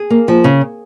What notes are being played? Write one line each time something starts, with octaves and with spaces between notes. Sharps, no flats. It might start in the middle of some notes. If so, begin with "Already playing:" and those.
Already playing: G#4
A#3
F3
C#3